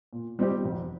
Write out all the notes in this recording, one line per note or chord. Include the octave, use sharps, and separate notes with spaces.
A#2
G3 C4 D#4 G4
F1